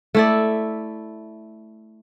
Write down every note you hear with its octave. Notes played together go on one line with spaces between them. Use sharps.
A3 E4 D5